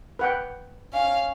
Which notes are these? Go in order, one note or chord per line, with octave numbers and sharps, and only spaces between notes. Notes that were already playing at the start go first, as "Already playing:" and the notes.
B4 F#5 G5
C#4 F5